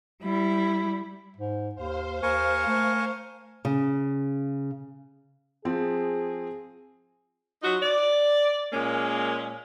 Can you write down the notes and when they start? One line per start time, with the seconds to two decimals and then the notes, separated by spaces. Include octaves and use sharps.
0.22 G3 E4
1.36 G#2
1.75 D#2 C5 F5
2.23 D#2 A#4 G#5 C#6
2.67 A3
3.65 C#3
5.65 F3 C4 G#4
7.63 F#3 D#4 F4 F#4
7.82 D5
8.73 A#2 G#3 A#3 C#4